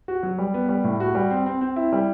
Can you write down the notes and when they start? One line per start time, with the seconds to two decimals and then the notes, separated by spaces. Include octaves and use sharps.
0.08 F#4
0.23 F#3
0.38 G3
0.54 B3
0.69 G3
0.84 A2
1.00 F#4
1.15 G3
1.31 C4
1.46 C4
1.61 C4
1.76 E4
1.92 G3